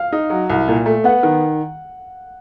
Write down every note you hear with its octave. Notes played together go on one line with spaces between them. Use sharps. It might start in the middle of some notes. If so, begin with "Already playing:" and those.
Already playing: F5
D#4
F#3
C2
A#2
A3
B3 F#5
D#3